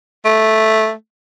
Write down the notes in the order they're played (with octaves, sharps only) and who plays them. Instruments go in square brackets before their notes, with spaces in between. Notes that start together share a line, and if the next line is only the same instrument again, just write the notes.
[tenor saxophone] A3